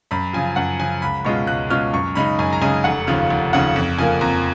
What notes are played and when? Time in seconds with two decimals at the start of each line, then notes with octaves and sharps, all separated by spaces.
0.11 F#2 B5
0.33 C#3 F3 G#5
0.56 F#2 F#5
0.79 C#3 F3 G#5
1.02 C#2 B5
1.25 B2 G#3 C#4 F4 C#6
1.47 C#2 F#6
1.70 B2 G#3 C#4 F4 F6
1.93 F#2 C#6
2.15 C#3 G#3 D#4 B5
2.39 F#2 G#5
2.53 A#5
2.61 C#3 G#3 D#4 G#5
2.84 F1 F#5
3.07 D#2 C#3 F3 F5
3.30 F1
3.53 D#2 C#3 F3 F#5
3.76 F2
3.98 C#3 F3 A#3 G#5
4.21 F2 A#5